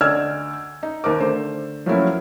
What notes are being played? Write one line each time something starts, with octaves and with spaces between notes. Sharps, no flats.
D2 D5 D#5 E6 F6 G#6
D#4
D#2 A#4 C5 D6
D3 A3 C5
F3 F#3 A3 A#3 C#4 E4